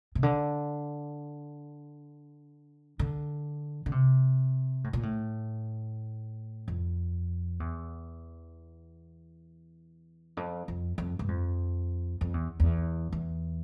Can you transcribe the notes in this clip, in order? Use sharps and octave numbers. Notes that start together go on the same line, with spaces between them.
C3
D3
D3
D3
C3
A2
A#2
A2
F2
E2
F2
F2
F2
G2
F2
F2
E2
E2
E2